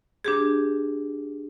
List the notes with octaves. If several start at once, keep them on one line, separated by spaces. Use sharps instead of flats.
D4 G4 G#4